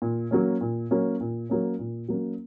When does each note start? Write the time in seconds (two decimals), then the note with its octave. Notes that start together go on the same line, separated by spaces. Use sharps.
0.02 A#2
0.31 F#3 A#3 C#4
0.61 A#2
0.91 F#3 A#3 C#4
1.21 A#2
1.50 F#3 A#3 C#4
1.79 A#2
2.08 F#3 A#3 C#4